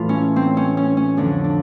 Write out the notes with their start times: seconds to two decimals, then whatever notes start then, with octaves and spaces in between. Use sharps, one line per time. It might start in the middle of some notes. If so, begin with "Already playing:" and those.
Already playing: A2 E3 F4
0.09 C#4
0.36 C4
0.57 C#4
0.77 C#4
0.97 C#4
1.17 F2 D3 F3 D4
1.44 D4